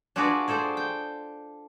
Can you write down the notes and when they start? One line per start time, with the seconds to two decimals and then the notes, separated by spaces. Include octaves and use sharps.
0.16 D4 F4 F#4 G#4 B4 D5
0.48 G#4 A4 C5 D5
0.77 G5